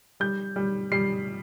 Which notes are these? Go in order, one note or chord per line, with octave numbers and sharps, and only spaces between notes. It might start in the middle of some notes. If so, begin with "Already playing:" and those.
G3 G6
G3
G3 C7